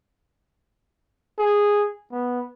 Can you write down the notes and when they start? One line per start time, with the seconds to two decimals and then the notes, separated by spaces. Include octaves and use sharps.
1.38 G#4
2.12 B3